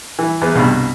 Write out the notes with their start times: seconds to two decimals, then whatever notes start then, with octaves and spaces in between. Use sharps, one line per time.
0.19 E3
0.41 E2 B4
0.55 C2 G2 B2